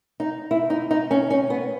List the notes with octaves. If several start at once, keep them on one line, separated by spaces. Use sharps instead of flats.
D#4
E4
D#4
D#4
C#4
C#4
B3